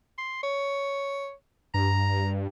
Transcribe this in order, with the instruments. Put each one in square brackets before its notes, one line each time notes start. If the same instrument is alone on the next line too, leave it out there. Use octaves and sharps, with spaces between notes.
[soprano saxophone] C6
C#5
[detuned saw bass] G2 [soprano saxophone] A#5